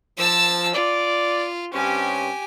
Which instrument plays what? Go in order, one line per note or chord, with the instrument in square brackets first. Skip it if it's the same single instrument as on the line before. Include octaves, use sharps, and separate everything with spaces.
[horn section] F3 [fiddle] A5 E6
[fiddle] F4 [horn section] D5
[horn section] G2 C4 C#4 [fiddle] G4 G#5